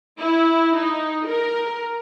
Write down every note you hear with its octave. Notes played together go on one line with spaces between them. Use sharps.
E4
D#4
A#4